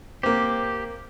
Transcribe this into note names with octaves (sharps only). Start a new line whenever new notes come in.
A#3 C4 G4